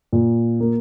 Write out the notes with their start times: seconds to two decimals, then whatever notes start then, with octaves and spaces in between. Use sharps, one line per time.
0.13 A#2
0.60 A#3